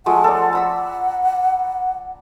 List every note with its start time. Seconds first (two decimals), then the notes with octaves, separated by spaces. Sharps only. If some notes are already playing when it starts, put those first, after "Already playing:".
0.06 F3 G#3 A3 F#5
0.24 A4 D5
0.53 F#5 A#5 B5 E6